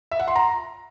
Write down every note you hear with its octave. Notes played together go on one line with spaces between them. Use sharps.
E5
F#5
C6
A#5